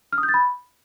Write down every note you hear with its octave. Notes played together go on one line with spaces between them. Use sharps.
F6
D#6
G6
A6
B5